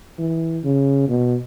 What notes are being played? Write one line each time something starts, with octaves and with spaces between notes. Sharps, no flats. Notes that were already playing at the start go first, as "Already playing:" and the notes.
E3
C#3
B2